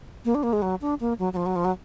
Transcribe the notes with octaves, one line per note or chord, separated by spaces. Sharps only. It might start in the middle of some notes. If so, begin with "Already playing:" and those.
A#3
D4
A#3
G#3
F#3
D4
A#3
F#3
F#3
F3
F#3
F3
F#3